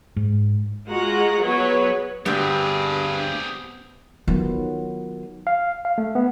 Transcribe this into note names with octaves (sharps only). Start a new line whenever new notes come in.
G#2
G#3 F4 F#4 F#5 A#5
F#3 B3 F#4 G#4 B4 C#5
D2 G2 G3 B3 C4 G4 G#4
D#3 F#3 B3 F4
F5
F5
A3
B3